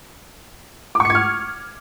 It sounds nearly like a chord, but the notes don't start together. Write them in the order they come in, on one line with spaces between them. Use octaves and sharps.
D6 C#6 C#7 G#6 F6